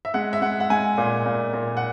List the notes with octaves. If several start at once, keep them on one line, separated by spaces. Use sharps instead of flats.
E5
G#3 F#5
E5
G#3 F#5
F#5
G#3 G#5
A#2
A#2
A#2
F#5